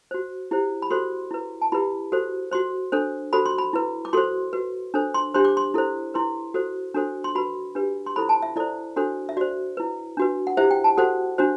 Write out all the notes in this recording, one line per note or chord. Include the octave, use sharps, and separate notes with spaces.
F#4 C5
E4 G4 C5
B5
F#4 A4 C5 C6
E4 B4
A5
E4 G4 B4 B5
F#4 A4 C5
F#4 C5 C6
D4 A4 C5
F#4 A4 C5 B5
C6
B5
E4 B4
D6
F#4 A4 C5 C6
F#4 B4
D4 A4 C5
C6
D4 G4 C5 C6
D6
C6
E4 A4 C5
E4 B4 C6
F#4 A4 C5
D4 F#4 A4 C5
C6
F#4 B4 B5
D4 G4 B4
C6
E4 A4 C5 B5
A5
E5
E4 A4 C5 D5
D4 F#4 A4 C5
E5
F#4 C5 D5
E4 B4
D4 F#4 B4
F#5
E4 G4 C5 E5
G5
A5
F#4 A4 C5 F#5
D4 F#4 C5